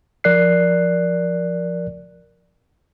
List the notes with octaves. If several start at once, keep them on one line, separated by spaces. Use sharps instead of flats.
F3 A#4 D5 F#6 C7